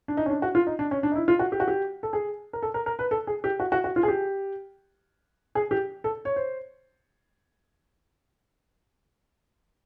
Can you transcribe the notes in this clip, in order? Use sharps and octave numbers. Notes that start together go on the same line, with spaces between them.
D4
D#4
C#4
D4
F#4
F4
D#4
D4
C#4
D4
D#4
E4
F4
F#4
G4
F#4
G4
A4
G#4
A#4
A4
A#4
A#4
B4
A4
G#4
G4
F#4
F#4
F#4
F4
G#4
G4
G#4
G4
A4
C#5
C5